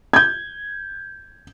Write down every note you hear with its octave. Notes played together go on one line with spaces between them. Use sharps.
G6 G#6